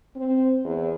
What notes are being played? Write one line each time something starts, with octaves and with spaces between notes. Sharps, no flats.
C4
E2